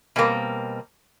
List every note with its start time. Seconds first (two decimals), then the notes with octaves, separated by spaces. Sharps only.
0.16 B2 G3 A#3 C4